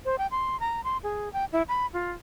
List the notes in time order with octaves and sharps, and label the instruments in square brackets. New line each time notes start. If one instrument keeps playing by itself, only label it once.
[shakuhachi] C5
G5
C6
A#5
C6
G#4
G5
E4
B5
F4